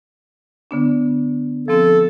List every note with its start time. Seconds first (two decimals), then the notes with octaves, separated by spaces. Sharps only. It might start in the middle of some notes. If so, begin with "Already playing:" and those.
0.71 D3 B3 D4
1.68 F3 C4 A4